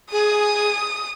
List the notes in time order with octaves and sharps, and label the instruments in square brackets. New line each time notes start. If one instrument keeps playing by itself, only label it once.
[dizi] G#4 [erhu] D#6